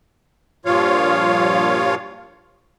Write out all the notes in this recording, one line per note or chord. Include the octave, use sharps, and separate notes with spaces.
G2 A#2 F3 F4 C#5 F5